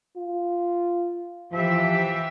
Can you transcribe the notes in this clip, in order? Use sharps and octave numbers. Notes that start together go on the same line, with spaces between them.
F4
E3 F3 G4 E5